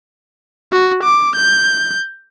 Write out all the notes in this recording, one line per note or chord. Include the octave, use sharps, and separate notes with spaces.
F#4
D6
G6